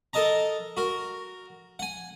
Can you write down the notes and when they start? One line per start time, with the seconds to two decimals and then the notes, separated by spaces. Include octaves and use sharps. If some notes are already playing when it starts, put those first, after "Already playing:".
0.13 A4 A#4 D#5 A5 A#5
0.77 F#4 A#4
1.79 F#5 G#5